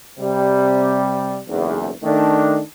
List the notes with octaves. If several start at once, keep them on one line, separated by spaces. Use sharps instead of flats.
C3 G3
F#1 B1 E2
D#3 A3 D4